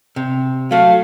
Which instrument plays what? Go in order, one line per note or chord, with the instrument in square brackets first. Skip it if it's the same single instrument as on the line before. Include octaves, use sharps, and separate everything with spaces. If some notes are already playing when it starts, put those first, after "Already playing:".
[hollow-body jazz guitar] C3
[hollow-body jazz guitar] F#3 A3 F#4 [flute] F5